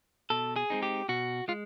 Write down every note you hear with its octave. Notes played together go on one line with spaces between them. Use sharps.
B2 A4
G#4
G#3 C4 D#4
G4
B2 F#4
G#3 F4